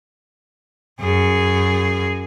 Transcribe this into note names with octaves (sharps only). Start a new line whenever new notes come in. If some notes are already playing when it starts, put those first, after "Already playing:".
F#2 G#4